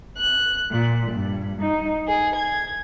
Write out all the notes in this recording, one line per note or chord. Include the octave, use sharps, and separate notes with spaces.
F#6
A#2
G2
D#4
G#4
G#6